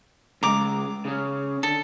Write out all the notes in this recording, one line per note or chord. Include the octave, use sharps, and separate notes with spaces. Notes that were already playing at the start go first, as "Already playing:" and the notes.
C#3 G#3 A#5 D6
C#3 C#4
D3 A4